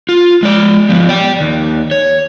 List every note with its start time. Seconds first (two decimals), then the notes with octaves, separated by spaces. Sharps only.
0.09 F4
0.43 G#3 D5
0.89 F3 B3
1.09 D5 G5
1.41 D#2
1.91 C#5